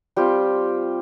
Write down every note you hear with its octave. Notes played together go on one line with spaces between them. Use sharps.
G3 C4 F4 G4 G5